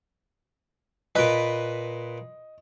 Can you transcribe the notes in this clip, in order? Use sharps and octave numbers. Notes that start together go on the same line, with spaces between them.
A#2 B4 D#5